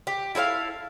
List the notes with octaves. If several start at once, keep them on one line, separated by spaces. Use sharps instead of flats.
G4
E4 A4 C5 F5